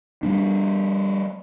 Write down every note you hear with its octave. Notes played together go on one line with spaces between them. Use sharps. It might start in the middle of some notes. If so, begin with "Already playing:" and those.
G3 A3 D4